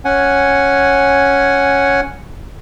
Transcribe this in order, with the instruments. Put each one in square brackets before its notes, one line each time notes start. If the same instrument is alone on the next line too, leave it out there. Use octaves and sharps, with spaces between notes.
[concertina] C#4 F#5 G#5